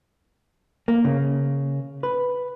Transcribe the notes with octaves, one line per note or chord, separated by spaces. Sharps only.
A#3
C#3
B4